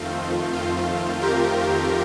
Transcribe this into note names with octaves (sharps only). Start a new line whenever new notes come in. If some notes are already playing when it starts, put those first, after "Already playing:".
Already playing: F2 D#3 A3 C4 F4
F4
G4 A#4